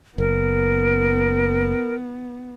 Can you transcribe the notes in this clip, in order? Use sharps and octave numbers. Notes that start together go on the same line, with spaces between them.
F#1 B3 A#4